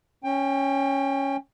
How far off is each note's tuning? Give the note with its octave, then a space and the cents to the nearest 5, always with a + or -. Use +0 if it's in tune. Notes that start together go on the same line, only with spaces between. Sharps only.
C#4 +0 G5 +25